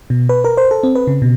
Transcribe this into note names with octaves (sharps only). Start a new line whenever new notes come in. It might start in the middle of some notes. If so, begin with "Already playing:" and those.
B2
B4
A#4
C5
A4
C4
B4
C#3
B2